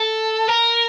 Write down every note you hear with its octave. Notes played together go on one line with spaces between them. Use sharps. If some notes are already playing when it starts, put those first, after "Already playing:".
Already playing: A4
A#4